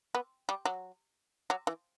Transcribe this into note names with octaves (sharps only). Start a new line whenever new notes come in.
B3
G3
F#3
F#3
E3